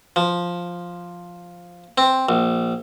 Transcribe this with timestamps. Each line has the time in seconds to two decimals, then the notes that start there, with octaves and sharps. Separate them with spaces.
0.16 F3
1.98 C4
2.29 A#1